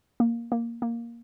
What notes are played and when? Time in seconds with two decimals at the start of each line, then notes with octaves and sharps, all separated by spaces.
0.20 A#3
0.52 A#3
0.82 A#3